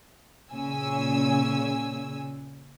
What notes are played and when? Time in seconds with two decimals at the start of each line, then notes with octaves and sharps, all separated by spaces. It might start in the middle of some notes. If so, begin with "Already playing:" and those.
0.52 A#2 C#3 G#5 E6